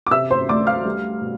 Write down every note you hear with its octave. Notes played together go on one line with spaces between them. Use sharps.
D6
C3 E5 E6
C5 C6
D2 D5 D6
F5 F6
G3
B2